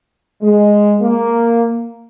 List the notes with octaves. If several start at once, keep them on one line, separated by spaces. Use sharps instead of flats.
G#3
A#3